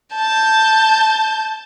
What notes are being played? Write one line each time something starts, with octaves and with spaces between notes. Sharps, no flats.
A5 G6